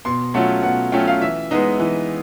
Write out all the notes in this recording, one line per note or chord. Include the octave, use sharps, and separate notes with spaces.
B2 C6
F#3 A3 C#4 F4 F#5
B2 F#5
F#3 A3 C#4 F4 G5
F5
E3 E5
G#3 B3 D#4
E3